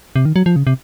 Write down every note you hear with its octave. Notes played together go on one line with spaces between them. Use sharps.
C3
D#3
F#3
F3
C#3
C3